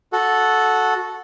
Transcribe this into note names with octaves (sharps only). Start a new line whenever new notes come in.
F#4 A4